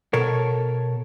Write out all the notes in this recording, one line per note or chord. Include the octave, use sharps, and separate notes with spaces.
B2 A4 A#4 C#5